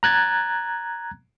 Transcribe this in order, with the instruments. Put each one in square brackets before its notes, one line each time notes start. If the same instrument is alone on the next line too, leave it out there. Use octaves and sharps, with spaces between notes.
[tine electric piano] A#5 F#6 G#6 A6